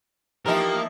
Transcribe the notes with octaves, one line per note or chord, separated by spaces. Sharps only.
E3 F3 A#3 D#4 G4 A#4